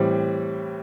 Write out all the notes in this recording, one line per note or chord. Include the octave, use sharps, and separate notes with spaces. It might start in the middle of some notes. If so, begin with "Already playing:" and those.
Already playing: A2 E3 G3 C4